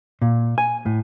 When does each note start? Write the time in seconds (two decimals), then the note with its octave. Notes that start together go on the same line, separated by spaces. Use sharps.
0.22 A#2
0.58 G#5
0.86 A2